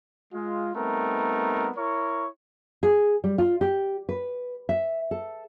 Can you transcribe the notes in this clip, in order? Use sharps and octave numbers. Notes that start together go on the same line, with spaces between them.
G#3 F4
G3 A3 B3 C4 D#4 A#4
E4 A#4 C#5 C#6
G#4
G3
F4
G4
B4
E5
A4